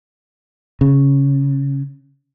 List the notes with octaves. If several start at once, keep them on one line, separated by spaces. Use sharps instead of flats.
C#3